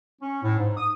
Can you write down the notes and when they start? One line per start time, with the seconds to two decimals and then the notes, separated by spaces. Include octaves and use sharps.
0.21 C#4
0.43 A2
0.59 G#2
0.77 D#6